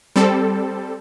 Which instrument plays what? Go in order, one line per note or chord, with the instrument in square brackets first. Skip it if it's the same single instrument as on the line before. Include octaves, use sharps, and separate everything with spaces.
[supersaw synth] G3 C4 A4